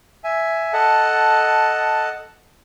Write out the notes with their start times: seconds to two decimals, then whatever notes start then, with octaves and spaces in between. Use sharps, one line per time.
0.24 E5 G#5
0.73 A4 D#5 F#5 A5